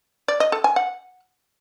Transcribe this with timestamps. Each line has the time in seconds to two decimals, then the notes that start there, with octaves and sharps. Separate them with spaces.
0.28 D5
0.40 D#5
0.52 A4
0.64 G#5
0.76 F#5